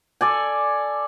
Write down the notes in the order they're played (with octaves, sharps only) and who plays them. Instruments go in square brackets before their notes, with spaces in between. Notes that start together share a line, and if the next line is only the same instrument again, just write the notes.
[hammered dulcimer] A4 D5 G#5